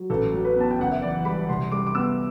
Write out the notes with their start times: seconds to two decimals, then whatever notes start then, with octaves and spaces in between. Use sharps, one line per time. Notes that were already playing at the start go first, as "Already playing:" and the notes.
Already playing: F#3
0.10 A1 A4
0.33 F#3
0.45 B4
0.56 B3 A5
0.71 G5
0.79 F#1 F#5
0.91 E5
1.02 E3 D5
1.25 G3 B5
1.49 C2 C6
1.72 G3 D6
1.87 D6
1.95 B3 E6